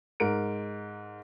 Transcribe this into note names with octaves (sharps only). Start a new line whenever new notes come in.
G#2 A#4 D7